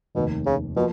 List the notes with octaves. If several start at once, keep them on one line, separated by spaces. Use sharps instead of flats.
F1 D#2 B2 D#3
C#3
B2 F3 A#3